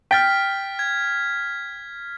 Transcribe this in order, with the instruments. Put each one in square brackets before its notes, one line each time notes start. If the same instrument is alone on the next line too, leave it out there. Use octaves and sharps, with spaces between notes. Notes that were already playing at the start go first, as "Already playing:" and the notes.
[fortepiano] G5 [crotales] F6 A6 B6
[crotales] G#6